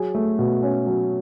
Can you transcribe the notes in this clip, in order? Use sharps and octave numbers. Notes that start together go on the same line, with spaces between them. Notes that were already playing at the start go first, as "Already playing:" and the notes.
Already playing: F#3 G#4
A3
B2
C#4
F#3